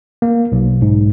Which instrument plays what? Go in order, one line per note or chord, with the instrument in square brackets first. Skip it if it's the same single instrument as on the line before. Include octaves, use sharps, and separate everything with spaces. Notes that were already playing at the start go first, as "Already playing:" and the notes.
[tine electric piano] A#3
B1
G#2